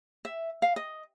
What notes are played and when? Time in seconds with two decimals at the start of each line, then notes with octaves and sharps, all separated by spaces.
0.25 E5
0.62 F5
0.76 D#5